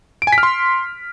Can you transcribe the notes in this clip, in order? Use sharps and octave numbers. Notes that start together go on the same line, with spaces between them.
D7
G#5
B6
F6
C6